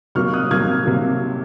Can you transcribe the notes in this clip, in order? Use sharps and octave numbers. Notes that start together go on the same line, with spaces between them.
C3 F#3 A#3 C#6 F6
D#6 F#6
C3 F#3 A#3 F6 G#6
C3 F#3 A#3